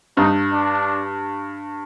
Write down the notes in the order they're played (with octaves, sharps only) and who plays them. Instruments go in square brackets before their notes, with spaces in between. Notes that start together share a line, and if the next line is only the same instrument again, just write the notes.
[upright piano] G2 [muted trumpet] D#4
[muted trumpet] D4